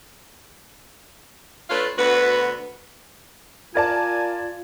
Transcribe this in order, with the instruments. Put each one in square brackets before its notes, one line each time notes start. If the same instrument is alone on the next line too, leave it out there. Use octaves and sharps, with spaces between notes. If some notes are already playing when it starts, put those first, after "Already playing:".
[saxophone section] A3 D4 F4 B4 C#5 F5
D2 B3 F#4 B4
[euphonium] F4 [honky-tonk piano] A#4 D5 A5 [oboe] G#5